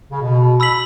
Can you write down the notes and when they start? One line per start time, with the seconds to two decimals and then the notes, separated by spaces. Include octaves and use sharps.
0.11 C#3
0.22 B2
0.60 B5 E6 B6 F#7